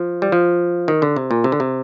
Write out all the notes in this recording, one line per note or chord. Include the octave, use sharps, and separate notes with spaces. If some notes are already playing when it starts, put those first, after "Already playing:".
Already playing: F3
G3
F3
D#3
D3
C3
A#2
C3
D3
C3